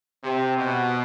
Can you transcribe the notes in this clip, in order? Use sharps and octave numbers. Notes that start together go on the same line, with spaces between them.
C3
B2